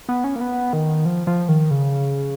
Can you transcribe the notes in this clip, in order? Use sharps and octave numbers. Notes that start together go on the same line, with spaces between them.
B3
C#4
A#3
B3
D#3
F3
F3
D#3
C#3